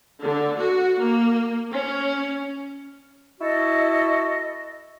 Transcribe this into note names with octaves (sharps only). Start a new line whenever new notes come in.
D3
F#4
A#3
C#4
E4 F#4 A4 D#5